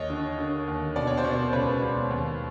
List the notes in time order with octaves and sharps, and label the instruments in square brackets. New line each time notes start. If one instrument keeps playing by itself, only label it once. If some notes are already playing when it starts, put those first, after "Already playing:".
Already playing: [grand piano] D#2 C#5 D#5
D3
D3
D#2
B2 D5
C#5
C5 D5
B2
C#2 B4 C#5
B2
D#2